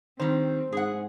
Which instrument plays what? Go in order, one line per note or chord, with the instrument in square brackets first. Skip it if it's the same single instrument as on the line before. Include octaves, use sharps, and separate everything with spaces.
[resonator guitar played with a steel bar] D#3 G3 [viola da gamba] C4 [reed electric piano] C5
[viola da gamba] G#2 [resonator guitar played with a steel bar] G#4 F#5